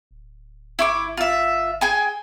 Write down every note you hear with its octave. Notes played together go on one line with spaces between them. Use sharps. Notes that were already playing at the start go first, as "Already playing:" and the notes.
D1
G1 E4 C#6 D6
F4 E5
G#4 G5 G#5